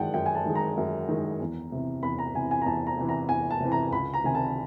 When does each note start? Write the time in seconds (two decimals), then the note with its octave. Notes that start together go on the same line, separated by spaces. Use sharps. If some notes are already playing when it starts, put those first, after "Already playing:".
Already playing: F#2 D#3 G#3 D5 F#5 G5 A5
0.14 F#2 G5
0.26 G#5
0.35 A5
0.46 D#3 G#3
0.55 A#5
0.77 F#2
1.09 D#3 G#3
1.41 E2
1.72 C3 E3
2.03 E2 B5
2.19 A#5
2.35 C3 E3 G#5
2.51 G#5
2.62 A#5
2.66 E2 A5
2.87 A#5
2.98 C3 E3
3.09 A#5
3.29 E2 G#5
3.51 A5
3.60 C3 E3
3.72 A#5
3.92 C#2 B5
4.14 A#5
4.24 C3 D#3 G#5
4.35 A5